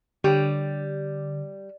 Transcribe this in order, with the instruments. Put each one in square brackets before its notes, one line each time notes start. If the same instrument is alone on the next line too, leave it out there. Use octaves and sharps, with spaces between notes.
[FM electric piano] D3 [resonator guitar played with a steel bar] G3 [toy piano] G4 C#5 G5